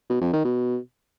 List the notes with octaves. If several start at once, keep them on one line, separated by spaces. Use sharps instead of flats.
B2
F2
D#3
B2